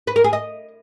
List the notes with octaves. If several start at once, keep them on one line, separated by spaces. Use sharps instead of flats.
B4
A#4
G#4
D#5